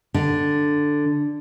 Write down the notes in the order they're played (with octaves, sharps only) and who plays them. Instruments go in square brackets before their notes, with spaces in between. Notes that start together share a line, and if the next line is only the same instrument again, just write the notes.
[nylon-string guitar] D3